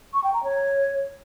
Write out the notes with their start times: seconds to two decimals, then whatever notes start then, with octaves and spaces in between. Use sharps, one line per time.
0.14 C#6
0.24 G5
0.34 A#5
0.44 C#5